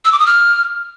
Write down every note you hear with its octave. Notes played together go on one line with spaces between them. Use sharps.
E6
D6
D#6
F6